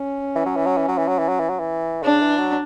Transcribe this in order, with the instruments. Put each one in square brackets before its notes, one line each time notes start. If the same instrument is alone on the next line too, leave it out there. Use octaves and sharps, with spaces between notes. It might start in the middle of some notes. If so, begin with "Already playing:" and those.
Already playing: [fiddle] C#4
[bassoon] E3
F#3
E3
F#3
E3
F#3
E3
F#3
E3
F#3
E3
F#3
E3
[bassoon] C#3 [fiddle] D4
[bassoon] E3
F#3